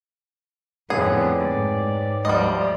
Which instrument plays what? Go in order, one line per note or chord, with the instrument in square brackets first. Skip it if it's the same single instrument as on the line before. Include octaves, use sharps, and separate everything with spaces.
[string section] F2 A2 [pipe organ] D3 B3 [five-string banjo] G#4 [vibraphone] B4 C#5 G5
[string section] G#2 [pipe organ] D5
[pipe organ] D2 F3 D5 [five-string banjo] G3 D#5